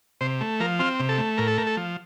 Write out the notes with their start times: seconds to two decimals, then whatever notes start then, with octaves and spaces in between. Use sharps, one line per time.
0.21 C3 C5
0.41 A3
0.60 F3 A#4
0.79 C4 F4
1.00 C3
1.09 A4
1.18 A3
1.38 A2 A#4
1.48 A4
1.58 A3 A#4
1.67 A4
1.77 F3